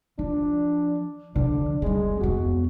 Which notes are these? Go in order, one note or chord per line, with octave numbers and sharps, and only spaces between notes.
F3 D4
D3 F3 D4
G3 G#3 C4
F2 B3 F#4